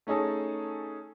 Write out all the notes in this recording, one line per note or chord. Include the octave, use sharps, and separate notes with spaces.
A3 C#4 D#4 G#4 A4